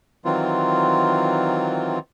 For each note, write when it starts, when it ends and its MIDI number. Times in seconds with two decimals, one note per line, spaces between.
0.25 1.99 51
0.25 1.99 52
0.25 1.99 54
0.25 1.99 60
0.25 1.99 65